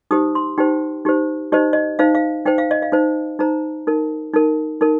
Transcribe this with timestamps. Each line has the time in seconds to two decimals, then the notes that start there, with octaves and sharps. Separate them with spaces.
0.11 D#4 G4 C5 D#6
0.35 C6
0.58 D#4 G4 C5 G5
1.05 D#4 G4 C5
1.52 D#4 G4 C5 D#5
1.73 D#5
1.99 D#4 C5 F5
2.15 F5
2.45 D#4 C5 G5
2.58 F5
2.71 D#5
2.82 F5
2.92 D#4 C5
3.39 D#4 C5 A#5
3.87 D#4 A#4
4.34 D#4 A#4
4.81 D#4 A#4